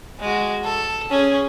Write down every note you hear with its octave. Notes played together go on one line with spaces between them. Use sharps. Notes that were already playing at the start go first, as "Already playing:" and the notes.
G#3 F#4
A4
C#4 G#4